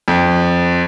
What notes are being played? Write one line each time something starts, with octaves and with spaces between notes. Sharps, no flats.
F2